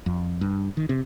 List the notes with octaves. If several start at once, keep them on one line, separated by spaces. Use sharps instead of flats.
F2
G2
D#3
C3